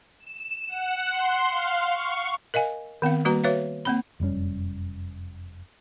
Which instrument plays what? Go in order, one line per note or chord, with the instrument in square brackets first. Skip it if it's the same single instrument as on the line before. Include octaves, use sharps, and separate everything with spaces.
[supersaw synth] E7
F#5
C6
F5
C#6
[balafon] A#4 D#5 F5 G#5
D#3 B3 C4 F5
G3 A#3 F#4 B4 A#5
F#4 B4 C#5 E5 F5
A#3 C4 B5
[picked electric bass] F1 F#2 G3 C#4